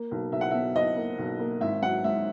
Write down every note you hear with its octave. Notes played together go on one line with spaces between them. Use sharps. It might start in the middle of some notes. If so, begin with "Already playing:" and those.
Already playing: A#3
B1
B1 E5
F#5
B2 E5
B1 D#5
A#3
B1
A#3
G#1 E5
F#3 F#5
G#2 E5